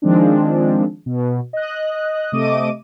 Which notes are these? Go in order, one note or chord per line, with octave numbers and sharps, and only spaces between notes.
D#3 F3 G#3 C4 D4
B2
D#5 F#6
C3 A3 D#5 D6 D#7